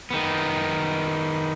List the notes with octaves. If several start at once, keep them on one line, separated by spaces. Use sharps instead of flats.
D#3 B3